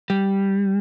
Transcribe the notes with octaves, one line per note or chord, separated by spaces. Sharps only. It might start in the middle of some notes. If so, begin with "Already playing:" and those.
G3